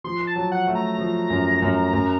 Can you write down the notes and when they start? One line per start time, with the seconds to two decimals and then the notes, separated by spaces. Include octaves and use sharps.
0.04 F3 C6
0.27 A5
0.36 F#3
0.52 F#5
0.67 A3
0.75 A#5
0.98 F3
1.30 F#2
1.62 F#2
1.93 F#2